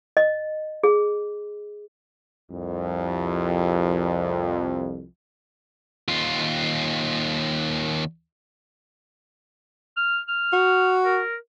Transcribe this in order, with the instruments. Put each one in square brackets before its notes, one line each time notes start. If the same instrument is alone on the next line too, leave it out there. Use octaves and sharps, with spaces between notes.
[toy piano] D#5
G#4
[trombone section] C2 F2
[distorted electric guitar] D#2 F4
[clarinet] F6
F6
[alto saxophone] F#4
[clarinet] A#4